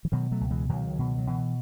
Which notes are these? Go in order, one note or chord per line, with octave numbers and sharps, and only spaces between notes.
E3
B2 D#3 F#3
F#3 A3
C#2
E3 G#3
C#2 D#3 F#3
B2
F#3
B2 E3